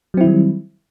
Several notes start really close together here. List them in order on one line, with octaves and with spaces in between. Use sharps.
F#3 C4 E4 D#3 G3